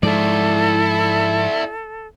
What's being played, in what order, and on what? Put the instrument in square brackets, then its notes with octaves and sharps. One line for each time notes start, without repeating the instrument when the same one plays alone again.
[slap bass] G#2 F3 G#3 [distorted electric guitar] E4 D5 [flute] A4